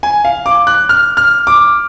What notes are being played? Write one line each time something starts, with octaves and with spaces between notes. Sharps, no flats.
G#5
F5
D6
F#6
F6
F6
D6